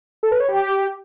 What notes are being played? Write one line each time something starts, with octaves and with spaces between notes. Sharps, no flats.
A4
B4
C#5
G4